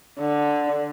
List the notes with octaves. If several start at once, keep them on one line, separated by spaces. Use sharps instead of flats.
D3